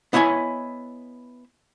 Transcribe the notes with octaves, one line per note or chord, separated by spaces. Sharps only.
B3 E4 C#5 D#5 G#5